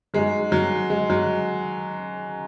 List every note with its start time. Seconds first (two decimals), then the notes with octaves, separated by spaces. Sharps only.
0.14 G#2 F#3 G#3
0.52 F#3
0.90 G#3
1.10 F#3